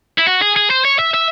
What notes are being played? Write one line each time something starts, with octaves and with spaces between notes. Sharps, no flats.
E4
F#4
G#4
G#4
C5
C#5
E5
E5